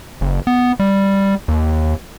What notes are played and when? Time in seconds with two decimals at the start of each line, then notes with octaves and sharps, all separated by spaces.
0.21 F#1
0.47 B3
0.80 G3
1.48 D#2